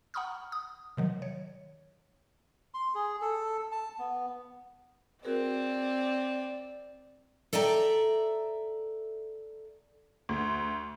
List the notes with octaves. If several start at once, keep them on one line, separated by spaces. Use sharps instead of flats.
F#5 A#5 B5 C#6 D#6 F6
D#6
C3 D#3 F#3
C#5
C6
G#4
A4
A5
B3
C4 F#4 G#4 A#4 D5
A4 D5 E5 G5 A#5
D2